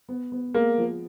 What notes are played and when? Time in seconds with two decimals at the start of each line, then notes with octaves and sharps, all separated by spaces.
0.09 B3
0.32 B3
0.54 G#3 A#3
0.78 F3